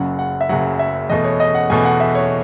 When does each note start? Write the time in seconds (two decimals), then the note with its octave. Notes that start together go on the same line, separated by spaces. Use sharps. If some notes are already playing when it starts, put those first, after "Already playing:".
Already playing: F#1 F#2 C#3 F#3 F#5
0.19 F#5
0.41 E5
0.49 F#1 F#2 C#3 F#3 F#5
0.79 E5
1.10 E2 B2 A3 D#5
1.24 C#5
1.40 D#5
1.55 F#5
1.70 E2 B2 A3 G#5
1.85 F#5
2.00 E5
2.15 C#5